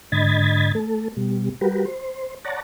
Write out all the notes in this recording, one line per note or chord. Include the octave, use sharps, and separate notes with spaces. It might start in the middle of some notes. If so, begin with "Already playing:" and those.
G#2 D3 D#5 B5 G#6 A6
A3 A4
B2 G3
G3 F#4 G4 A#4 B4
C5
C#5 D5 F#5 A5 A#5